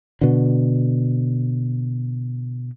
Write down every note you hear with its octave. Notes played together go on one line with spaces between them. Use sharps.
B2 D3